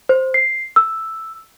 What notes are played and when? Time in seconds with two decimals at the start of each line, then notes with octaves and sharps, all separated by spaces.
0.09 C5
0.34 C7
0.76 E6